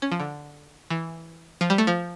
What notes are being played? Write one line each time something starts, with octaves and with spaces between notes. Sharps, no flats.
C#4
F3
D3
E3
F3
G3
A3
F3